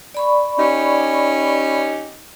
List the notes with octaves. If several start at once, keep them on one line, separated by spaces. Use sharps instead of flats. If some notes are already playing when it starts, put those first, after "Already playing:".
D5 B5 C#6
C#4 D#4 G4